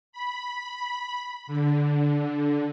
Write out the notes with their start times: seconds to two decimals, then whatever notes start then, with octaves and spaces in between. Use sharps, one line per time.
0.12 B5
1.47 D3